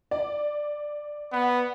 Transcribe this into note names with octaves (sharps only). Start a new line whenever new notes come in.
D5
B3